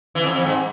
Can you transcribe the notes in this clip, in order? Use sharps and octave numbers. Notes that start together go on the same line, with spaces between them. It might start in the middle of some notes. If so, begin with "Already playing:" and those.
E3
F2
F2
G#2